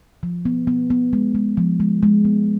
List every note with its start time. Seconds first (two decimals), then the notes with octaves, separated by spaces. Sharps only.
0.23 F3
0.45 B3
0.67 B3
0.90 B3
1.13 G#3
1.35 G#3
1.57 F3
1.80 G#3
2.03 G#3
2.25 B3